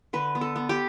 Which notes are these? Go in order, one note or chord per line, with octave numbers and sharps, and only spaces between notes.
D3 B4
B3
A4
B3
G4